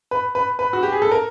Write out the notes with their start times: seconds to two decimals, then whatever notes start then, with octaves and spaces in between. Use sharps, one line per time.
0.11 B4
0.35 B4
0.59 B4
0.73 F#4
0.83 G4
0.92 G#4
1.02 A4
1.11 A#4